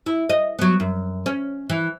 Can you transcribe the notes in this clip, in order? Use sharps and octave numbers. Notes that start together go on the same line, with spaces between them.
E4
D#5
F#3 B3
F#2
C#4
E3